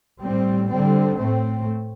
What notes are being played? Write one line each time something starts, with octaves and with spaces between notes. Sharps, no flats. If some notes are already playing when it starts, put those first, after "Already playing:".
A2 G3 C4
D3 G3 C4
A2 A3 C4